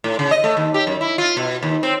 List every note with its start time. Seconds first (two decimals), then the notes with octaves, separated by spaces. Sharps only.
0.04 A2
0.19 C#3
0.31 D#5
0.44 A3
0.57 D#2
0.74 G4
0.87 F#2
1.01 E4
1.18 F4
1.37 B2
1.63 D#2
1.83 C4